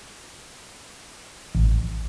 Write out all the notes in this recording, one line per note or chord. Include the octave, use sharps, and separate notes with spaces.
A1